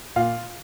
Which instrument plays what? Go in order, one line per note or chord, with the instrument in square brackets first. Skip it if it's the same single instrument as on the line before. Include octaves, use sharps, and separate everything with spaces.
[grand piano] A#2 F4 F5